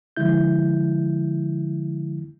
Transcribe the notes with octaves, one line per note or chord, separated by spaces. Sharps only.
D3 F3 G#3 E4 G6